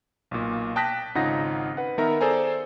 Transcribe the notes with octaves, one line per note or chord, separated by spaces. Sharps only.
B1 A#2
G5 A5 D#6 F#6 A#6 B6
G#1 C#3 D#4 F4 F#5 A#6
B4 F#5
D#3 B3 A#4 E5 A#5
G#4 A4 C5 D5 G#5 A#5